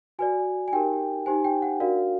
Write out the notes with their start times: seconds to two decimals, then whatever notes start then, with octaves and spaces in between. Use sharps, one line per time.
0.19 F#4 B4 D5 G#5
0.68 G#5
0.72 D#4 G4 A#4 G5
1.26 D#4 G4 C5 G#5
1.45 G5
1.62 F#5
1.80 D4 F#4 A#4 D5 F5